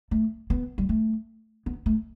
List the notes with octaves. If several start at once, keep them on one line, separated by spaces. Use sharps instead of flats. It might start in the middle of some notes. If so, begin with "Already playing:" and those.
A3
B3
G3
A3
B3
A3